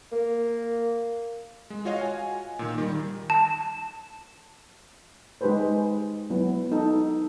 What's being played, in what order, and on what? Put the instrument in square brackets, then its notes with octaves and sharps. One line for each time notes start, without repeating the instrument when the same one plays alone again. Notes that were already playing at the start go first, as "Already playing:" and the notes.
[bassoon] A#3
[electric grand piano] G#3
F4 F#4 C#5 D#5 F5
G#5
A#2 D#3
D#3 G3
[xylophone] A5
[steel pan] G#3 D#4 G4 G#4 B4 C5
F#3 B3 E4
D#4 A4